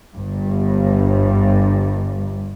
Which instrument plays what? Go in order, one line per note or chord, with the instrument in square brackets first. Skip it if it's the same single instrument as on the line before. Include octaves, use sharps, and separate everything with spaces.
[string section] G1 G2